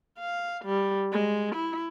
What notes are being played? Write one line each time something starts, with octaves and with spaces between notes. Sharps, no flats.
F5
G3
G#3
E4